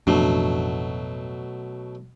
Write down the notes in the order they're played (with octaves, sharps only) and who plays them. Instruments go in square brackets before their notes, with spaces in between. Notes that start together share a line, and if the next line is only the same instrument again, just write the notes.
[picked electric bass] A1 F2 D4 [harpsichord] B2 F#3 A3